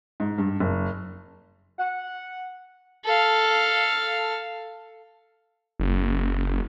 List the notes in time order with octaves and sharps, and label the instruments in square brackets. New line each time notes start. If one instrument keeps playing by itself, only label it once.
[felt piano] G#2
G2
F#1
[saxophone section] F#5
[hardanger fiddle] A4 F5
[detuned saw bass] F#1